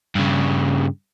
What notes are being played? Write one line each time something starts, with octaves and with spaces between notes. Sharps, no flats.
G2 C#3